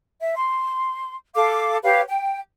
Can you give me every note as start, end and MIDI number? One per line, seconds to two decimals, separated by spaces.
0.21 0.34 76
0.35 1.16 84
1.35 1.77 69
1.35 1.77 77
1.35 1.77 86
1.83 2.01 67
1.83 2.01 71
1.83 2.01 73
1.83 2.01 77
2.09 2.38 79